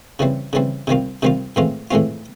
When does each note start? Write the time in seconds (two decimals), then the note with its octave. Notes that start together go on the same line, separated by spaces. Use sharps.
0.19 C#3 E3 G3 C4
0.53 C#3 E3 G3 C4
0.87 C3 D#3 G3 C4 F4
1.23 C3 D#3 G3 C4 F4
1.56 A2 E3 G#3 C4 F4
1.91 A2 E3 G#3 C4 F4